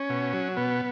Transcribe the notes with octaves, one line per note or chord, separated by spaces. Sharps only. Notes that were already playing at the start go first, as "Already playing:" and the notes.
Already playing: C#4
B2
F#3
B2 B3